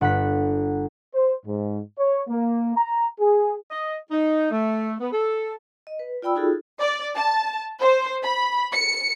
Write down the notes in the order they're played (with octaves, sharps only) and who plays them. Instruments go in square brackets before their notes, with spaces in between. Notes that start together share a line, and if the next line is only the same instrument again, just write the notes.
[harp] G1 F#5 B5 F#6 B6
[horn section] C5
G#2
C#5
A#3
A#5
G#4
[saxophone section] D#5
D#4
A3
B3
A4
[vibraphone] D#5
B4
F4 D5 G5 B5 E6
D#4 F4 F#4 G#4 A4
[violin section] D5
A5
C5
B5
C#7